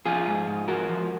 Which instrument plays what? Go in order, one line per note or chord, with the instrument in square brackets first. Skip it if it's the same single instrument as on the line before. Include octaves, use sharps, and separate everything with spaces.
[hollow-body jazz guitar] F3 F4 G#4
G#2
G#2
F3 F#4 A#4
F3